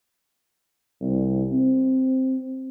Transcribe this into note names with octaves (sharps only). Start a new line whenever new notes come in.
C2
C4